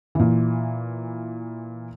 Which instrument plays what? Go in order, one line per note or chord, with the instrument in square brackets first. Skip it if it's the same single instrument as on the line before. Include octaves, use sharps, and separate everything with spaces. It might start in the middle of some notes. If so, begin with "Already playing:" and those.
[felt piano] A#2 E3